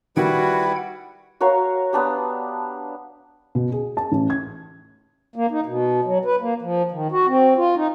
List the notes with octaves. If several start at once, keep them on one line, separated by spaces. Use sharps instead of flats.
D#3 G3 E4 F#4 B4 F#5 G5 G#6
F#4 A#4 C#5 F5
B3 D4 G4
B2
G#4
A5
A1
G#6
A#3
D#4
B2
F#3
B4
A#3
F3
D#3
F#4
C4
F4
D#4